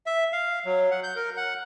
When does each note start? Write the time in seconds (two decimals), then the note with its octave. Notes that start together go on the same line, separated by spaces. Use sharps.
0.06 E5
0.33 F5
0.65 F#3
0.91 F#5
1.03 G6
1.16 A#4
1.37 F#5